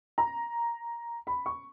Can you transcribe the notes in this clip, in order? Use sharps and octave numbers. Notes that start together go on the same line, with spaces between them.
A#5
B5
C#6